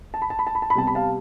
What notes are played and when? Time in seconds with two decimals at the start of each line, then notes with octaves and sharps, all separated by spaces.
0.14 A5
0.22 B5
0.30 A5
0.39 B5
0.47 A5
0.55 B5
0.62 A5
0.70 B5
0.75 C3 G3 B3 A5
0.87 B5
0.95 F5 A5